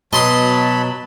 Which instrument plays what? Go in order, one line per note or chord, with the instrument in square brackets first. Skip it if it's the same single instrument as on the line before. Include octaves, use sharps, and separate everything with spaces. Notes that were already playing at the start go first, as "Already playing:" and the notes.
[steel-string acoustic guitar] B2 [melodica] F#3 A5 B5 [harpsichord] D#5 C6 D#6